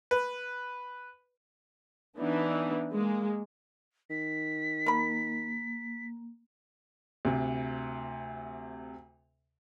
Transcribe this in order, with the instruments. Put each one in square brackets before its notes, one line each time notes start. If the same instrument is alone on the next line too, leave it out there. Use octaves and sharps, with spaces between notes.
[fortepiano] B4
[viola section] E3 B3 D4 D#4
G#3 A#3
[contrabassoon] D#3 [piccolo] B6
[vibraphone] A#3 [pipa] A#4 B5
[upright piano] D2 C3